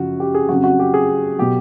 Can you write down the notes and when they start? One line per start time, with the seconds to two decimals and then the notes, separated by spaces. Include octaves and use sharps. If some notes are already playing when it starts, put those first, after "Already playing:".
Already playing: F#2 C#3 F3 F#4
0.20 G4
0.34 G#4
0.49 F2 C#3 F#3 F#4
0.64 F#4
0.79 G4
0.94 G#4
1.38 B2 F#3 G4